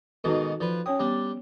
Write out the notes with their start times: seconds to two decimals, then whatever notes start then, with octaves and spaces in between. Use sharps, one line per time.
0.24 G#2 B2 D#3 D#4 F#4 A4
0.60 F3 B4 D5
0.86 C#4 C#5 G5 D#6
0.99 G3 B3 D4